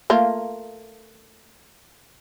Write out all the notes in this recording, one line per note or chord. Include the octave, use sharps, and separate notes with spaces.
A3 A#3 F4